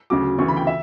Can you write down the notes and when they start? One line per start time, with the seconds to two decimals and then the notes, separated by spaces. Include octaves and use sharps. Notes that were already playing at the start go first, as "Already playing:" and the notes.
0.10 D2 C#3 F#3 D6
0.38 D2 C#3 E3 C#6
0.48 B5
0.57 G5
0.67 E5